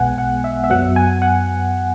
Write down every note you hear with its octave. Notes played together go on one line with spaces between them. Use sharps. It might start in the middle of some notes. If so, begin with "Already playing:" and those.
Already playing: B1 B2 G#3 B3 F#5 G#5
F#5
E5
E5
F#2 F#3 B3 F#5
G#5
F#5